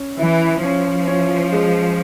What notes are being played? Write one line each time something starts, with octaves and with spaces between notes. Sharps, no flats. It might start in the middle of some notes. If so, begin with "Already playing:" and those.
Already playing: C#4
E3 E4
F3 C#4
C#4
G#3